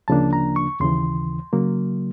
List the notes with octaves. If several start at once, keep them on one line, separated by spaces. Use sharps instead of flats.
D2 C#3 F3 A#3 D4 A5
A#5
C#6
D#2 C#3 E3 C6
C#3 F#3 A#3